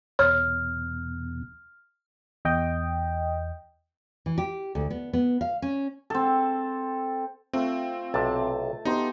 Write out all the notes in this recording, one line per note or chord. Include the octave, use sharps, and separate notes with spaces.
E2 B2 C#5 F6
E2 D#5 G5
E3
G4
D2
B3
B3
F5
C#4
C4 A4
A3 C4 F4
B1 C3 A5
B3 D#4 G4 C6